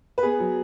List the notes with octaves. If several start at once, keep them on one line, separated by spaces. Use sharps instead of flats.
B4
B3 G#4
F#3